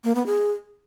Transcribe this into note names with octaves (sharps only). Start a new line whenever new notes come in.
A#3
B3
G#4